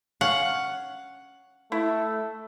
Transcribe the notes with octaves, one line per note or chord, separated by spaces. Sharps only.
C#4 C#5 F5 F#5
A3 E4